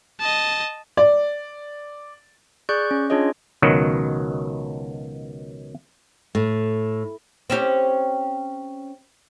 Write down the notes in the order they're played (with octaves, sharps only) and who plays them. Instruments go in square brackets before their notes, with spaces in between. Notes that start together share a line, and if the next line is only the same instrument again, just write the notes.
[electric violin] D#5 A5
[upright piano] D5
[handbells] G#4 D5 C#6 F#6 G6
C#4
C#4 D4 F4 G#4 C#5 D#5
[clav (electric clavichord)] C#2 B2 D#3 F#3
[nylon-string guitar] A2
[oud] C4 C#4 G4